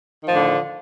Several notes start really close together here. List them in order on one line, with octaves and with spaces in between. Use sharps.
D#3 F3 A2 D3